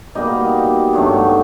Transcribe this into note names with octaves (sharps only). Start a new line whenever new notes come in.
B2 G3 A#3 D#4 D#5
G2 D#3 F#3 A3